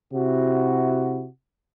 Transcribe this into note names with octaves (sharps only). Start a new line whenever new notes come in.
C3 E4 F#4